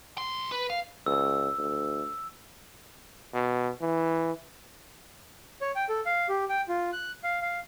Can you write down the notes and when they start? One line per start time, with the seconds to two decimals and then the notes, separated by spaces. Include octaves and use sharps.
0.18 B1 C6
0.52 B4
0.70 F5
1.06 C#2 E6
1.58 D2
3.34 B2
3.81 E3
5.61 C#5
5.76 G5
5.89 A4
6.06 F5
6.29 G4
6.49 G5
6.69 F4
6.93 F#6
7.24 F5
7.42 F5